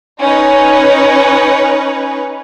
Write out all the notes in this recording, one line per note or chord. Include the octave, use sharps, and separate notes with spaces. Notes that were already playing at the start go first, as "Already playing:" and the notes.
C#4 D#4 B4 C#5